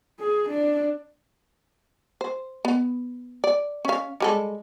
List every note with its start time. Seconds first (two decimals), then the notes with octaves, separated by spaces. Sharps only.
0.19 G#4
0.49 D4
2.21 C5
2.65 B3
3.44 D5
3.85 C#4 F5
4.20 G3 G#3 A4